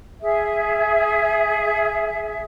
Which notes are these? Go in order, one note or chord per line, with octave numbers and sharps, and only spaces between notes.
G#4 E5